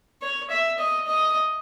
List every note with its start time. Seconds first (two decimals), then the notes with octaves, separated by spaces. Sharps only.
0.22 C#5
0.50 E5
0.79 D#5
1.07 D#5